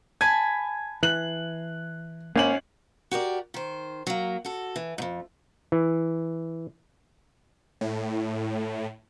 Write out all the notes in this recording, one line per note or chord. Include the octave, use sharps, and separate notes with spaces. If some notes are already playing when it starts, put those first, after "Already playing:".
G#5 A5 B5 G#6
E3 F#6 F#7
G#1 A#3 C#4 F#7
F#4 G4 A#4 D5
D#3 C5
F#3 A#3
F#4 A4
E3
F2 G#2
E3
A2